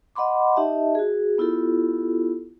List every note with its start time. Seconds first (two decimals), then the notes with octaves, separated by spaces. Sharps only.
0.15 D#5 F#5 B5 C6 D6
0.56 D#4 G4 D#5 E5 A5
0.95 F#4 G#4
1.38 B3 E4 F4 G4 A4